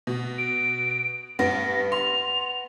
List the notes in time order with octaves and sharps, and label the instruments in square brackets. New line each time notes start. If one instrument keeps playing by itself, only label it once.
[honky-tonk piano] B2
[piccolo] D7
[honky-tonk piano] G2 [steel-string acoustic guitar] B3 [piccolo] A#6
[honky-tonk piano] C6 [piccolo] F7